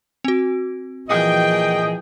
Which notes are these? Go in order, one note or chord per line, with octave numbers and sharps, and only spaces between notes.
C4 F#4
A#2 E3 F3 G#4 D#5 G5